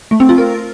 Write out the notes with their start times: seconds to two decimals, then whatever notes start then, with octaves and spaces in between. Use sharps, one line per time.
0.11 A3
0.20 C4
0.29 F4
0.38 A#4